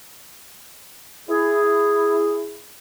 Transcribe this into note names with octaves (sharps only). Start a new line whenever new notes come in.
E4 G#4